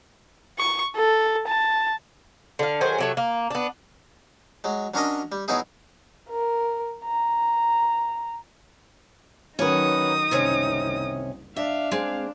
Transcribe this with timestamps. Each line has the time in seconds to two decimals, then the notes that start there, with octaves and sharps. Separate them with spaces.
0.59 C#6
0.96 A4
1.48 A5
2.59 D3 F5
2.81 D#3 F#3 G#4 C5
2.99 C3 F#3 A3
3.17 A#3
3.51 B3 D4
4.64 F#3 G#3
4.94 F#3 C#4 D4 A#4 D#5
5.32 G3
5.48 B2 F#3 B3 D#4 E4 G#4
6.29 A#4
7.05 A#5
9.59 D#3 F#3 C#4 D#4 B4 D#6
10.31 F#1 C2 C3 D#3 C#4
11.56 D4 E5 F5
11.91 G#3 C4